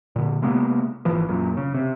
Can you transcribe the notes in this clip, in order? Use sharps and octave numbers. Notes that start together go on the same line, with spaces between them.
A#2 D3
C3 G#3 A#3 B3
G#1 E3 F3
F#2 A#2
C#3
C3